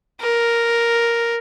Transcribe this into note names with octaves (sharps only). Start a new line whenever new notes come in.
A#4